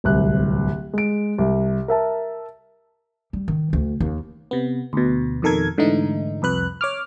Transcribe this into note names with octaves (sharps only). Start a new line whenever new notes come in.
D1 C2 F#6
G#3 D7
C2
A#4 E5 A5
G3
D#3
D2
D#2
C3 B3
D2 B2
F2 B2 D#3 A4 A#4 G#6
G#2 D3 E3 A3 D#4
C2 F2 B4 F#6
C#5 D6 F6